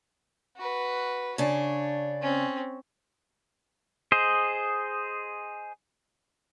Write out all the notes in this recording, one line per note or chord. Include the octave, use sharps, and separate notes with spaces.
F#4 B4
C#3 D4 C#5
C4 C#4
G#4 C5 D#5